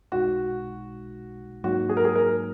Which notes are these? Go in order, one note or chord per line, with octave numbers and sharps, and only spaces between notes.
B1 B2 G#3 D#4 F#4
G#2 F#3 A#3 D#4 F#4
G#4
A#4
G#4
A#4